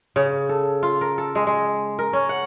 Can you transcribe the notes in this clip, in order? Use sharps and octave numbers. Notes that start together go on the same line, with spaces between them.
C#3
A4
F4
A#4
A4
G#3
G#3
A#4
C#4
F#5